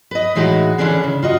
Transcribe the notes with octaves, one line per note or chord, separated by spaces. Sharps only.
B4 D#5
A2 E3 G#3 D#4 F#4
D3 E3 C#4 D4 G#4
C#3
F4 F#4 D#5